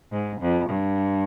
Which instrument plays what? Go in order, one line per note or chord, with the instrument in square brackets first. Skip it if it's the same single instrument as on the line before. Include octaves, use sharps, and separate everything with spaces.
[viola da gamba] G#2
F2
G2